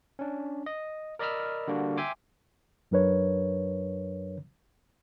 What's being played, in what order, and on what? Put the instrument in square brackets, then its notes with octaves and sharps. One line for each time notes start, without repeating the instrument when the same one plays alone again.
[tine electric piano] C#4 D4
D#5
A#4 D5 D#5 B5 E6 F6
D3 G3 A#3 D4 F#4
E5 G5 G#5 C6 D6
[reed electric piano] F#2 F#3 D4 A#4 B4 C#5